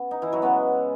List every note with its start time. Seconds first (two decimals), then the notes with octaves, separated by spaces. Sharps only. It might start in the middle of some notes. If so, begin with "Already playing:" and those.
Already playing: B3 C#4
0.11 D#4
0.22 E3 E4
0.32 F#3 F#4
0.42 C#3 G#3 B3 C#4 B4